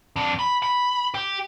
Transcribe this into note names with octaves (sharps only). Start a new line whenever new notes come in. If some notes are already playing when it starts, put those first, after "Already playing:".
F2 D4
B5
B5
G4 G5